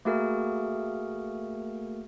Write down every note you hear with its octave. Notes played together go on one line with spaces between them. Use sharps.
A3 A#3 F#4 G#4 A#4